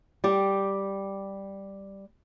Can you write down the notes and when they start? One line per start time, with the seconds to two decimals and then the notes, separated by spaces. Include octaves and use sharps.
0.24 G3 G4